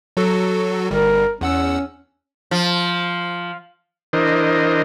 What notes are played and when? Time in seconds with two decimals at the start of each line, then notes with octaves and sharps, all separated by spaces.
0.17 F#3 F#4 A4
0.91 G1 G3 A#4
1.41 E2 C#4 F#5 E6
2.51 F3
4.13 E3 D4 A#4 C5 D#5